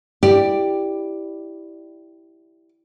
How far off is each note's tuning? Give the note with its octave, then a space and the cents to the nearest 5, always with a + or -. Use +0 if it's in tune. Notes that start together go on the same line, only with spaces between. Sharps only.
E4 +0 G4 +0 D5 +10